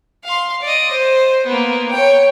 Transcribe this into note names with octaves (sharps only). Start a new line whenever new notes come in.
F5 C6
D5 D#5
C5
A#3 B3
C#5 G5